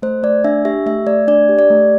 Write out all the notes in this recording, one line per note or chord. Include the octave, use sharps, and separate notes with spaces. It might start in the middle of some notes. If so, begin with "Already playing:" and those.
A3 C5
A3 D5
D4 E5
G4 E5
A3 E5
A3 D5
D4 D5
G4
D5
A3